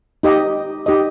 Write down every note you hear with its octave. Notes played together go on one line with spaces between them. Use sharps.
D#4 G4 D#5
D#4 G4 D#5